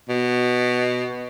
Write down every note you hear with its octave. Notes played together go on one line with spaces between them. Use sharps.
B2